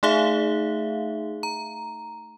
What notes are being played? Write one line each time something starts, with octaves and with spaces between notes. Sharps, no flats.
A3 D#4 G#4 E5 F5
A#5